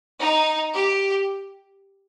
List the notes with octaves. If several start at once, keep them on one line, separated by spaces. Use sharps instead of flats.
D#4
G4